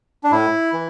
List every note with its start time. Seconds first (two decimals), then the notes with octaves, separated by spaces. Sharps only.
0.24 D4
0.32 A2 E4
0.73 E3